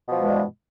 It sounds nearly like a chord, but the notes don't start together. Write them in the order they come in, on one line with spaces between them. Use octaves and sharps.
B2 F3 G#3 E3 G2